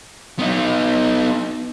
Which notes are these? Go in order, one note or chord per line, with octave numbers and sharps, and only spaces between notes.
B3 D#4